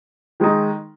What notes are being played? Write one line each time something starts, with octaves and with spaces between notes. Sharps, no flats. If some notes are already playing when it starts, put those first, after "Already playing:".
D#3 G#3 D#4